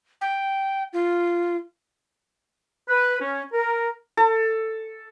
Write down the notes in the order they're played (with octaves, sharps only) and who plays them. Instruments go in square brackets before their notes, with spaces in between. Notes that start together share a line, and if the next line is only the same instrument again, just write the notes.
[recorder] G5
F4
[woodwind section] B4
C#4
A#4
[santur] A4